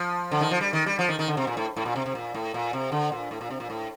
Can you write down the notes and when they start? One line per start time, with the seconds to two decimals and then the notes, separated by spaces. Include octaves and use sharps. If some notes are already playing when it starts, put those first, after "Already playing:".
Already playing: F3
0.31 D3
0.41 D#3
0.51 F3
0.61 G3
0.73 D#3
0.86 G3
0.99 F3
1.09 D#3
1.19 D#3
1.28 D3
1.37 C3
1.47 A#2
1.57 A2
1.77 A2
1.85 A#2
1.96 C3
2.06 C3
2.15 A#2
2.34 A2
2.54 A#2
2.73 C3
2.92 D3
3.12 A#2
3.31 A2
3.41 A#2
3.50 C3
3.60 A#2
3.70 A2